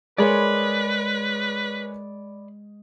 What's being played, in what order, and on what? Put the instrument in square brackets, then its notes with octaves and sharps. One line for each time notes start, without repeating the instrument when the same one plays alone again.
[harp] G#3 [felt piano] G#4 A#4 C#5 [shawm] B4 [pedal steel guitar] D5 B5 C6